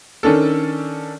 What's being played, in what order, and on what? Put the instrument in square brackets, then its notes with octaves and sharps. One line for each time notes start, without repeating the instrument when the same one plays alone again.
[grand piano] D#3 C#4 D4 A4